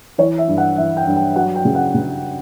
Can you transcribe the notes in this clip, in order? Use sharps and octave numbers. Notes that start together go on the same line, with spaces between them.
E3 C#5
E5
G2
F#5
E3 E5
G5
G2
G5
F#3 F#5
G5
C#3
F#5
C#3